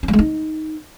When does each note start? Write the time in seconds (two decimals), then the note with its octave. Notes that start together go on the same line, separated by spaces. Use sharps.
0.03 C#4
0.08 G3
0.13 G#3
0.19 D#4